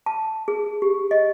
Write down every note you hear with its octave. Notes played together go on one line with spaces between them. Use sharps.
A5
G#4
G4
D#5